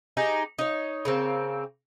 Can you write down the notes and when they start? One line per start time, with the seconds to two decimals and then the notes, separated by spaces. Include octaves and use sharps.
0.17 D#4 G4 G#4
0.59 D#4 C#5
1.05 C#3 A#3 C4